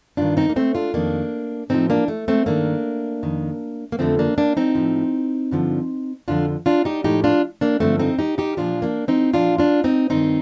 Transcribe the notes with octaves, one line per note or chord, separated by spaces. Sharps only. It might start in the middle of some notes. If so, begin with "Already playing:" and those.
G2 D#3 D4 F4
C4 D#4
A#3
A3 C4
D4 F4
F2 D#3 A#3 D4
A2 F3 C4 D#4
A#3 D4
A3
A3 C4
G2 D#3 A#3 D4
F2 D#3
A#3
F2 D3 F3 A3 C4
A#3 D4
A#3 D4
C4 D#4
A2 F3
G2 D3 F3
F2 D3 F3 D4 F4
D4 F4
D#4 G4
A2 F3 D#4 G4
D4 F4
A#3 D4
G2 D3 F3 A3 C4
C4 D#4
D#4 G4
D#4 G4
A#2 F3 D4 F4
A#3 D4
C4 D#4
A#2 F3 D4 F4
D4 F4
C4 D#4
G2 D#3 C4 D#4